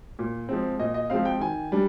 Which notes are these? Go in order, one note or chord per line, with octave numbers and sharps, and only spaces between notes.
A#2
F3 G#3 C4
A#2 D#5
D#5
F3 G#3 C4 F5
G5
D#3 G#5
G3 D4